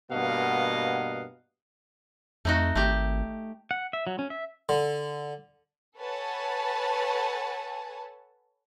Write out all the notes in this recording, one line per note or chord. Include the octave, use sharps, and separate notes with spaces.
G2 B2 A#3 D#5 F5 F#5
F2 A3 D#4 F#4
G#1 A3 G4
F#5
E5
F#3
C#4
E5
D3
A4 B4 C#5 F#5 G#5 A5